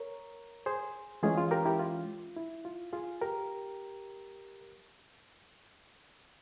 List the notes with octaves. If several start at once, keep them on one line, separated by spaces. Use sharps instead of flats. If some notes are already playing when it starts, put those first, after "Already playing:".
Already playing: A#4 C#5
G#4 C5
E3 G#3 C#4 F4 G#4
F4
G4 A#4
E4 G4
F4
E4
F4
F4 G#4
G4 A#4